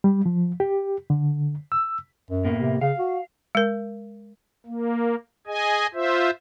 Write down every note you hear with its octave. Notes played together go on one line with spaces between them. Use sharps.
G3
F3
G4
D3
E6
F#2
A2 A#3 B3
C3
C#3 F5
F#4
G#3 A#4
A#3
G#4 D#5 G#5
F4 C5 E5